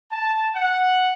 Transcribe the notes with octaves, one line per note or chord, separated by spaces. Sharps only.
A5
F#5